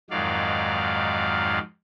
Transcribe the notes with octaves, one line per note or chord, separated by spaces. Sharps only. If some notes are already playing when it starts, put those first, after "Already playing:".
F2 G#2 D#3 F#3 D5 F5